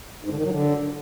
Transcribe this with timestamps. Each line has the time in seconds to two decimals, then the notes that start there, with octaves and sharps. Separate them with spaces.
0.25 G#2
0.31 D3
0.38 D#3
0.45 F#3
0.51 D3